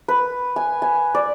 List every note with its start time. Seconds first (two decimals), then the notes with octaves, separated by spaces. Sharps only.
0.08 B4
0.56 G#5
0.82 G#5
1.15 D5